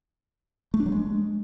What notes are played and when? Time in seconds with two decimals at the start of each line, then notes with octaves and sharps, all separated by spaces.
0.74 A3
0.80 D4
0.86 F#3
0.92 G#3